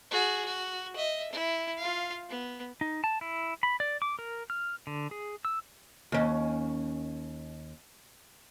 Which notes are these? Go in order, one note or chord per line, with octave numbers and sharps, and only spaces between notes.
F#4 G#4
F#4
D#5 E5
E4
F4 F5
B3
D#4
A5
E4
B5
D5
D6
A#4
F6
D3
G#4
E6
D#2 C#4